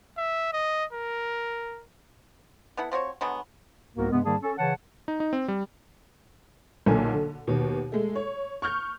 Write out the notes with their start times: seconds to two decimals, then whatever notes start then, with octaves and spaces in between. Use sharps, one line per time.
0.18 E5
0.53 D#5
0.93 A#4
2.77 B3 E4 A4 F#5
2.92 F3 C4 F#4 C#5
3.21 D3 F#3 G#3 B3
3.96 C2 G#2 A#3 B3 F#4 A#4
4.11 G2 C3 G#3 B3
4.25 G#2 D#3 G3 A#3 G#4 A5
4.41 C#4 A4
4.59 C#3 E3 C#5 F#5 A5
5.08 D#4
5.20 D#4
5.33 C4
5.48 G3
6.86 B1 A#2 D3 A#3 G#5
7.14 D3
7.47 D#2 B2
7.92 G#3 A3
8.15 C#5
8.62 C#6 F6 G6